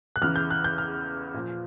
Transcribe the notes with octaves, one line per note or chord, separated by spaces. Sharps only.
F#6
E2 C#3 E3 F6
G6
F#6
G6
F6
A#2 F3